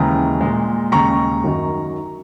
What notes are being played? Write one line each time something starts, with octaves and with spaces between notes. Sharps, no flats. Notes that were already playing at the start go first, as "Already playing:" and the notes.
Already playing: D#2 C#3 E3 G#3 A#5
A#2 G#3
D#2 C#3 G#3 A#5 C#6
F#2 D#3 F#3